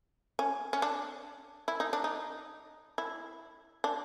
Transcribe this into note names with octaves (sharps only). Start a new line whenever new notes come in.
C#4
C#4
D4
E4
D#4
D4
D#4
E4
D4